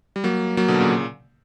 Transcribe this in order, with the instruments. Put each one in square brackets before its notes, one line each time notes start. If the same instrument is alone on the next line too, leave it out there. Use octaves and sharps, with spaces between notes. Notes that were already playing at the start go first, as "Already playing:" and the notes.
[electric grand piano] G3
F#3 A#3
F#3 A#3
B2 D3
A#2 C#3